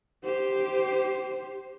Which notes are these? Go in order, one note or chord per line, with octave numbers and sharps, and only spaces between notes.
G4 C5